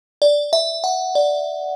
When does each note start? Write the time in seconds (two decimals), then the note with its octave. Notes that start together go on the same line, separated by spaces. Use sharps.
0.22 D5
0.53 E5
0.84 F#5
1.15 D5